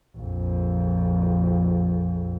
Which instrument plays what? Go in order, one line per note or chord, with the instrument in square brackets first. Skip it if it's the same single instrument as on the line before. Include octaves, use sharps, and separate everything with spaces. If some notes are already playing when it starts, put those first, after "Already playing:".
[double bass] A#1 F2